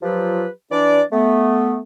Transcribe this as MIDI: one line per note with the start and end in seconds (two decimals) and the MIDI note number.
0.02 0.46 53
0.02 0.46 54
0.02 0.46 65
0.02 0.46 67
0.02 0.46 71
0.72 1.01 52
0.72 1.01 62
0.72 1.01 74
1.12 1.79 57
1.12 1.79 59